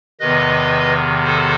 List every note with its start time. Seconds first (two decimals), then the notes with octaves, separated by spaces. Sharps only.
0.20 E2 C3 D#3 B4 D#5
1.24 A4 C5